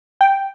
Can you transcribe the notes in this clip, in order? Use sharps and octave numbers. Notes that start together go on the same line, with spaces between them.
G5